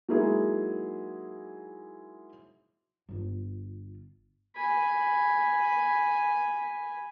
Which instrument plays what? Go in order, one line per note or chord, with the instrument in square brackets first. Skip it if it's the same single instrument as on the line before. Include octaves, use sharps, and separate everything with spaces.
[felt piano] F#3 G#3 A#3 D#4 E4 G#4
[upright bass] G1 F4
[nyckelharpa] G#5 B5